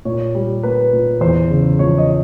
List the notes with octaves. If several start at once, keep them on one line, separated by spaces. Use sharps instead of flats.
A#2 C#5
G3
A#3 B4
A#2
E2 C5
C#3
F3 C#5
D#5